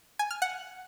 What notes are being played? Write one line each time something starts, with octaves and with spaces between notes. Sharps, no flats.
G#5
F6
F#5